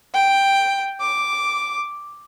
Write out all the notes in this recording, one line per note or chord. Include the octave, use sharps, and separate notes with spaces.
G5
D6